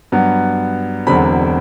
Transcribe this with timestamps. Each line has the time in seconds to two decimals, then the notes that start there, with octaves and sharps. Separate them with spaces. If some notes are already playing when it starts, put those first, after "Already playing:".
0.12 G2 F#3 B3
1.07 E1 E2 D3 F#3 C4 B5